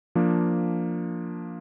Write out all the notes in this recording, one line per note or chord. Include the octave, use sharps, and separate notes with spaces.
F3 A#3 D4